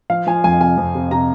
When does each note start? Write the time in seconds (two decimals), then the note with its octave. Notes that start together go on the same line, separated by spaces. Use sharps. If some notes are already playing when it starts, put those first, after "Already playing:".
0.10 F3 F5
0.27 F3 G#5
0.44 F2 G#5
0.60 C3 G#5
0.77 F2
0.95 C3
1.11 C3 A#5